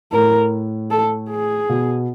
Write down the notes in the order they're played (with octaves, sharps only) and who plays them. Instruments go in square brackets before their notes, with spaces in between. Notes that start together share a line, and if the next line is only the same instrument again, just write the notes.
[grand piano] A2 [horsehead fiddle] A#4
[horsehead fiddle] A4
G#4
[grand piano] B2